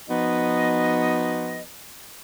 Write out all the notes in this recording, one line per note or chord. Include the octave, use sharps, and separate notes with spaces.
F3 B3 D#4 F#4 B4 D#5